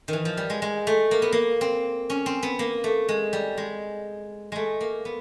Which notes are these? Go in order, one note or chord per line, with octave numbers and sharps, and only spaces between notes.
D#3
E3
F3
G3
G#3
G#3
A3
A#3
B3
A#3
C4
C#4
C4
B3
A#3
A3
G#3
G3
G#3
G#3 A3
A#3
B3